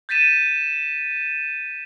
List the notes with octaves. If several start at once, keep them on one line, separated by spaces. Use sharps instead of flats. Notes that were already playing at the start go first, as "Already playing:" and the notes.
G6 A6 B6 D#7 E7